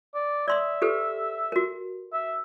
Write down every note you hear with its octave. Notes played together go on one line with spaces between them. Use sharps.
D5
D5 E5 C6 D#6
G4 A4 B4
F#4 A#4
E5